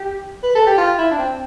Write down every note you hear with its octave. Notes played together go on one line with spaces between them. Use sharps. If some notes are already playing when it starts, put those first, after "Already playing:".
Already playing: G4
B4
A4
G4
F4
E4
D4
C4